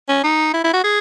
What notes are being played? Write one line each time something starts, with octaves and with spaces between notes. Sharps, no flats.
C#4
D#4
E4
E4
F#4
G#4